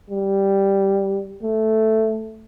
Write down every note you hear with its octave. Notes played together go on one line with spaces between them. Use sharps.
G3
A3